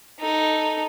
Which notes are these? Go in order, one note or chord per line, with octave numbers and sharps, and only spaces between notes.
D#4 A4